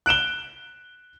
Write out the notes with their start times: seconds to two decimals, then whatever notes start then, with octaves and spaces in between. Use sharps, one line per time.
0.06 F#6 D7 E7 G7